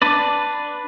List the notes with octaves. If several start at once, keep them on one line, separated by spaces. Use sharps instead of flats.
D4 B4 D5